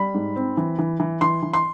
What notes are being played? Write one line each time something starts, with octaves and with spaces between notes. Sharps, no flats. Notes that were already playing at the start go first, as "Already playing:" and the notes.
Already playing: G3 B5
G#2
C4
E3
E3
E3
E3 C6
E3
C6